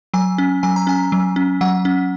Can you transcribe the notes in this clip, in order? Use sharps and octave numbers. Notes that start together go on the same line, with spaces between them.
F#3 G#5
C#4
F#3 G#5
A#5
C#4 G#5
F#3
C#4
F#3 F#5
C#4